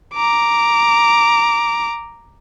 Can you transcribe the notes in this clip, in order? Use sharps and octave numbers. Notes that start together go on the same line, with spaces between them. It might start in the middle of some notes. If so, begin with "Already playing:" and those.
A#5 D6